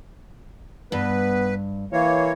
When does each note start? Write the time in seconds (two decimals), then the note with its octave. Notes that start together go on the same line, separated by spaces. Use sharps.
0.92 G2 B3 B4
1.92 E3 A#3 C#5